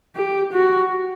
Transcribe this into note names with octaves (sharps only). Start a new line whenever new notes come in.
G4
F#4